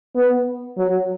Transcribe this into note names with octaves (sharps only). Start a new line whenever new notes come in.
B3
F#3